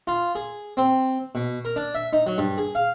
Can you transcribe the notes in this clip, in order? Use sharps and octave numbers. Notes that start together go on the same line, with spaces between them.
F4
G#4
C4
B2
A#4
D4
E5
D#4
F#3
G2
G#4
F5